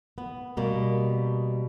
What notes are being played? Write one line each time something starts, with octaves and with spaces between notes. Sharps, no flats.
B3
B2 G3 A#3